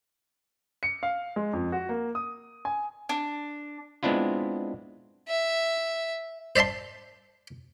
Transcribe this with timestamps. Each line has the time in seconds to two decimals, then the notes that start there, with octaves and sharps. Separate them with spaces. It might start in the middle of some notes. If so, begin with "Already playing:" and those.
0.83 C#7
1.03 F5
1.36 G#3
1.53 F2
1.72 F#4
1.89 A#3
2.15 D#6
2.65 G#5
3.09 D4
4.03 G#3 B3 C4 D4 E4 F4
5.28 E5
6.56 C5 D5 E5 A5 C6